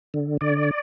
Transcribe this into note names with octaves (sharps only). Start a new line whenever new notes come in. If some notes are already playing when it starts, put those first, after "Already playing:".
D3
D3 D5